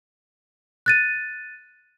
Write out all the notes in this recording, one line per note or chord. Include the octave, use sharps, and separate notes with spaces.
F#6 A6 D#7